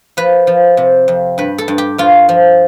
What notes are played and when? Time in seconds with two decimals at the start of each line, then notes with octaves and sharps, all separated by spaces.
0.17 F3 B4
0.47 F3
0.77 C3
1.08 F2
1.38 G2 B4
1.58 A4
1.68 G2
1.78 G4
1.98 G2 F4
2.29 F3